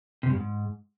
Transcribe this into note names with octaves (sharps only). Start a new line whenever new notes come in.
C3
G2
G#2